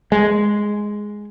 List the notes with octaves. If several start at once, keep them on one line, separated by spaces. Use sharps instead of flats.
G#3